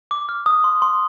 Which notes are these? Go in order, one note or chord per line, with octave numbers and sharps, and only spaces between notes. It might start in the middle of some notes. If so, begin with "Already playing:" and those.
D6
F6
D#6
C6
C6